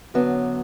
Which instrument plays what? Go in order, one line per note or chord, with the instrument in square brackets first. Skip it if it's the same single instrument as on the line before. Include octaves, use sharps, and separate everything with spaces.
[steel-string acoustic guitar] F#2 D3 F#3 B3